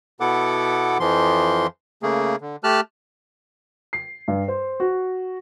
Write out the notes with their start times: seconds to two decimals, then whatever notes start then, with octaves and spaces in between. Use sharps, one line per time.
0.20 B2 B3 E4 A4 F#5 D6
1.00 F2 E3 F3 C6
2.03 C#3 A3 A#3 G#4
2.41 D3
2.64 A3 G4 A5 F6 F#6
3.93 C7
4.28 G2
4.48 C5
4.80 F#4